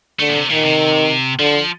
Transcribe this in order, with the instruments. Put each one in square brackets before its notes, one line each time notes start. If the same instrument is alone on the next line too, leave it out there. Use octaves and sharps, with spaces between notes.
[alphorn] D3 [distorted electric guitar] A3
[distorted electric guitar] A#2
C3
[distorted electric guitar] A#2 [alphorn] D#3
[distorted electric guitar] C3
[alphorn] D3 [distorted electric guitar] F3